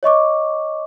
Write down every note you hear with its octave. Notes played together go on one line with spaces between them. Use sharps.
C#5 D#5 C#6 D6